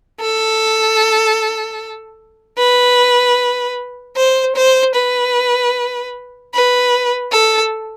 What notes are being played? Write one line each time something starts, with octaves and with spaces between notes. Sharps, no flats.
A4
B4
C5
C5
B4
B4
A4